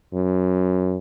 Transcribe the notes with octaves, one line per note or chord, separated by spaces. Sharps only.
F#2